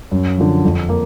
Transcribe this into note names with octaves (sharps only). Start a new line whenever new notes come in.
F#2
D3 F3
F2
A#3